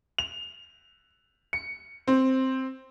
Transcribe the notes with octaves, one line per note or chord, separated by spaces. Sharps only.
F7
C#7
C4